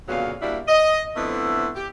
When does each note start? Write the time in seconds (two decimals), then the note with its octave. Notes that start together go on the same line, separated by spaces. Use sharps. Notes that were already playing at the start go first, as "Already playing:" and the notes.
0.09 D2 A#2 C#3 F#3 B3 F5
0.41 G3 A#3 D4 E4 F#4 D5
0.68 D#5
1.16 D3 F3 A3 B3 C4 E4
1.76 G4